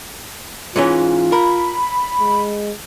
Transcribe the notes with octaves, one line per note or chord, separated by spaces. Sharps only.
G#2 E3 C#4 F4
A#4 B5
G#3